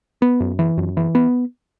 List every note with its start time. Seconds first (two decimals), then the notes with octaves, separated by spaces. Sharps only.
0.22 B3
0.40 F#2
0.59 E3
0.78 F#2
0.97 E3
1.15 B3